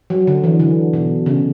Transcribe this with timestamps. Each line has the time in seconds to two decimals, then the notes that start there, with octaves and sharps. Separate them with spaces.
0.10 F#3
0.27 D3
0.44 E3
0.59 D3
0.94 B2
1.26 C#3